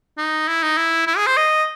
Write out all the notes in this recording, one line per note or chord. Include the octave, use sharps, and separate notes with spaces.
D#4
E4
D#4
E4
E4
G#4
C5
D#5